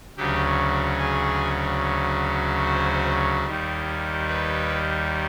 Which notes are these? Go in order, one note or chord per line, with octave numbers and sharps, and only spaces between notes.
D2 C#3 F#3 G4
G#4
C5
D#2 D#3 G3
B4